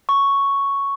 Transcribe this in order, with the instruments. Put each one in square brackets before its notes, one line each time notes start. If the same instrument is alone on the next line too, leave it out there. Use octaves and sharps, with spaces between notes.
[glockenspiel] C#6